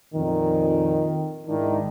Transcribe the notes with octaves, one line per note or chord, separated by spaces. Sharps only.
F2 A#2 D#3
G#2 D#3 D4 E4